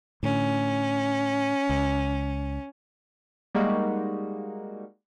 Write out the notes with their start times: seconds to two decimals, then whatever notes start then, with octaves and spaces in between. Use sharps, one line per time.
0.23 A2 D3 C#4
1.69 C#2
3.55 G3 G#3 A#3 D#4 F#4